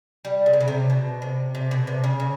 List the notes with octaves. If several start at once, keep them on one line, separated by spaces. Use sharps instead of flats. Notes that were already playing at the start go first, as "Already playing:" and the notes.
G3
C#3
C3
C#3
C3
B2
C3
C3
B2
C3
C#3
C#3